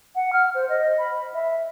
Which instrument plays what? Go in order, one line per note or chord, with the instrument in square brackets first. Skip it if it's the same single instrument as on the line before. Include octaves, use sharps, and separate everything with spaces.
[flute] F#5
F6
C5
D#5
B5
E5